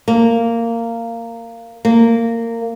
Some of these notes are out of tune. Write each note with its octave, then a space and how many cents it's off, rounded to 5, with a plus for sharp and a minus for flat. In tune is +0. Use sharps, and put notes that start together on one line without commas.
A#3 -15
A#3 -20